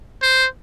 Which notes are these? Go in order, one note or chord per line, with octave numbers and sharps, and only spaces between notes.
C5